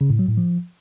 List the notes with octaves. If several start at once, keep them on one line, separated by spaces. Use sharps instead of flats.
C#3
A2
F#3
A2
F3